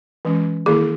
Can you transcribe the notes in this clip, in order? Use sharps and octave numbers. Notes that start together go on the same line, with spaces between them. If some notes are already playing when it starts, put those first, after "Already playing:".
E3 G#3 C#4
D#3 A#3 E4 G#4